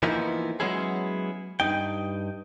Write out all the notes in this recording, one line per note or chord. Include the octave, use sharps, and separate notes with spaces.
E3 F3 A#3 B3 D#4 E4
F#3 G#3 B3 C#4 E4 G#4
G2 D#4 G5